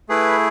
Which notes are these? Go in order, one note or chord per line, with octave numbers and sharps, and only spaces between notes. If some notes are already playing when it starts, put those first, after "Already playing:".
A3 E4 G#4 B4